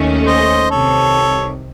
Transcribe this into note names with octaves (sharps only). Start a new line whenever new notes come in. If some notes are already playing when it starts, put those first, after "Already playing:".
Already playing: D#2 D#3 A3 C#4
C5 D#5
C2 C3 D#3 A4 C#5